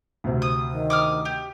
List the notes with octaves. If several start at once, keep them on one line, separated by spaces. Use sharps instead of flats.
D2 C3
D#6
D#3
D6 D#6 F6
G4